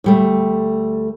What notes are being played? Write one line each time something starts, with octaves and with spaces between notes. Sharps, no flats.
D2 G3 A3